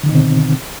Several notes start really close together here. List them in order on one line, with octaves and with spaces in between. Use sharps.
D3 D#3 D#4 B2 C4